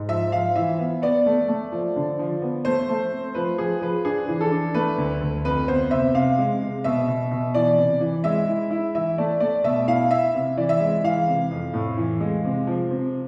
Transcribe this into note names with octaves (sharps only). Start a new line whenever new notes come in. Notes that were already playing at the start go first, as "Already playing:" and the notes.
Already playing: G#2
F3 E5
F3 F5
E3 E5
B3
B3 D5
A3
A3
F3
D3
F3
B3
A3 C5
A3
C4
F3 B4
F3 G#4
F3 B4
D4 G#4
E3
A4
D4
A3 B4
D2
D2
F2 B4
B3 C5
C3 E5
C3 F5
G#3
C3
B2 E5
B2
B2
E3 D5
C3
E3
G#3 E5
E4
E4
E3 E5
A3 D5
A3 D5
B2 E5
E4 F5
E4 E5
C3
E3 D5
E5
G#3
E3 F5
C3
F2
A2
E3
G#3
C3
F3
C3